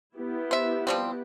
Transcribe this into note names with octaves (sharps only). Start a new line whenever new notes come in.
B3 E4 G4
C5 E5
F3 G3 C4